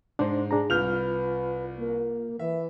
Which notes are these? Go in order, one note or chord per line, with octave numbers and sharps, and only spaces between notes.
G#2 G#3 D4 D#4 C5
D4 G#4 A#5
C2 F4 B4 F6 G6 F7
A#3
E3 E5